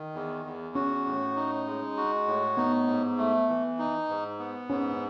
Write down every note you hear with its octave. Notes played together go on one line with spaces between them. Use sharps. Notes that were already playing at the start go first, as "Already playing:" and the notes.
Already playing: D#3
E2
E2
C#4 F#4
A2
D#4
G#3
F#4
A2
B3 D#4
G#2
A3
E3
D#4
G#2
B3
G#2 C#4